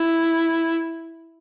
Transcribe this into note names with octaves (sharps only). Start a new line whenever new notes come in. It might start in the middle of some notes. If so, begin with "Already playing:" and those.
Already playing: E4